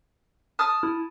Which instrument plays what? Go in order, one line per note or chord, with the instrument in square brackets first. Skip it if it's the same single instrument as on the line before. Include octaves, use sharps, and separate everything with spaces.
[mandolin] A5 D#6 [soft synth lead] F6
[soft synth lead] E4